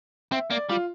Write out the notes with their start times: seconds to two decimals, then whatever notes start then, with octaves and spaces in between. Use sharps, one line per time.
0.32 C4 E5
0.50 A#3 D5
0.69 G3 F4